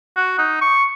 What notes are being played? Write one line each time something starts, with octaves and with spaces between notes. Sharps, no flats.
F#4
D#4
C#6